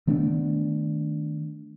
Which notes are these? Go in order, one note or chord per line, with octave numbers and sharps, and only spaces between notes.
D#3 A3 B3 D4